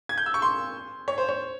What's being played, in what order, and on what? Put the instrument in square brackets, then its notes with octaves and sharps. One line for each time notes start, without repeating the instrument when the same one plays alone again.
[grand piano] G#6
G6
E6
C#6
C6
C#5
C5
C#5